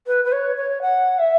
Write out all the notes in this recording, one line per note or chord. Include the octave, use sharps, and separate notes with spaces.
B4
B4
C#5
C#5
F#5
E5